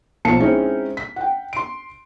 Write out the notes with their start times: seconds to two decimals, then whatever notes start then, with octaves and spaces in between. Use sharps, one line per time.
0.25 B1 F3 A5 C#7
0.40 G#3 C4 C#4 D#4 E4
0.97 B6
1.16 F#5 G5
1.53 C6 D7